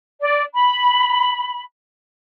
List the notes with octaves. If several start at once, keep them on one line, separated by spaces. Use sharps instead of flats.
D5
B5